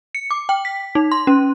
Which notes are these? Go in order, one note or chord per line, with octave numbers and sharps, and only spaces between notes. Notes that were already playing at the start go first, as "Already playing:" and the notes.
C#7
D6
G5
B6
D#4
C6
C#4